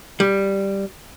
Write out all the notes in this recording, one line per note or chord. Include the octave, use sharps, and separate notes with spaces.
G3